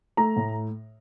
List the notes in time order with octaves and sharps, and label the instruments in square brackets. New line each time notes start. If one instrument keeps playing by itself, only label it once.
[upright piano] A3 A#5
A2